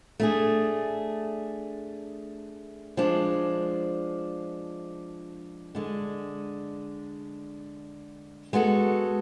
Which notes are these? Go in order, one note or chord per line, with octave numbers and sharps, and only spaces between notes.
A3 D4 G#4
F3 G#3 D4
D3 G#3 D4
G#3 B3 F#4 A4